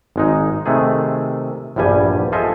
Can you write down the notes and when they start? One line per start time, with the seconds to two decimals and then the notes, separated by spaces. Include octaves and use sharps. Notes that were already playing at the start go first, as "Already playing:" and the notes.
0.16 G#1 G#3 D#4
0.66 C3 D#3 A3 G#4
1.76 A#1 E2 G2 G3 G#5
2.32 F4 G#4 A4 C5 D#5 E5